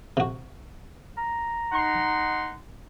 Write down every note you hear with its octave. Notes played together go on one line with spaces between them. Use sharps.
C3 F#4
A#5
D#4 F#5 C6